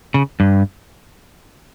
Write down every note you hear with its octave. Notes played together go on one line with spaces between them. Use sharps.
C#3
G2